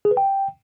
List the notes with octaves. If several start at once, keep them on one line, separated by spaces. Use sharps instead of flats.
G#4
B4
G5